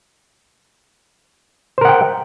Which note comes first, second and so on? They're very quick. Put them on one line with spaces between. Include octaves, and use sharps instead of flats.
C5 A#4 F#5 G5